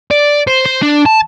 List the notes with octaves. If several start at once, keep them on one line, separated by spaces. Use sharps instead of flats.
D5
C5
C5
D4
A5